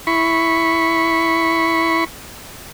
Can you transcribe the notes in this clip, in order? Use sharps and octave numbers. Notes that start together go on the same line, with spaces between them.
E4 B5 C#6